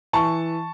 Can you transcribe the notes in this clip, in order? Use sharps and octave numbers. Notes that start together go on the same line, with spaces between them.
E3 A5 C#6